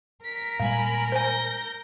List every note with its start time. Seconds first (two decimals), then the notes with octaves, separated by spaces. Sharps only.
0.25 A#4 B6
0.60 A#2 G3 G#3 F5 G#5 B5
1.12 C5 G#5 G6 A#6